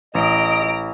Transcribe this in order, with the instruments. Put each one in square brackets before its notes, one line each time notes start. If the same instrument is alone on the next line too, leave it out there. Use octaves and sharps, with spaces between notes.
[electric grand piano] A1 [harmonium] D#5 [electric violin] A#5 D7